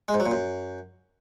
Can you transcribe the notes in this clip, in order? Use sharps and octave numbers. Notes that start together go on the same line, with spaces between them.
G#3
G#2
F#3
A#2
F#2